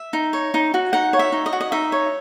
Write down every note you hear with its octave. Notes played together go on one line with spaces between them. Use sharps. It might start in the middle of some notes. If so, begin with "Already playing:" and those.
Already playing: E5
D#4
C#5
D#4
F#4
D#4 F#5
C#5
E5
D#4
D#5
F#4
D#5
D#4 E5
C#5